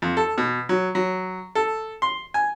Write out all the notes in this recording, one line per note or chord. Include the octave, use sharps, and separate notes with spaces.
F2
A4
B2
F#3
F#3
A4
C6
G#5